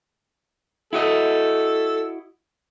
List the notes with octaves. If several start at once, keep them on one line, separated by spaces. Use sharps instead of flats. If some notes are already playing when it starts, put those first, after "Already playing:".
E4 F#4 A4 D#5